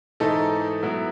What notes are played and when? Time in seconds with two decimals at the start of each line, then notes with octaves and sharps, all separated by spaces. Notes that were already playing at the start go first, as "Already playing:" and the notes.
0.20 G#2 E3 A3 D#4 A4
0.82 A2 F#3 B3 E4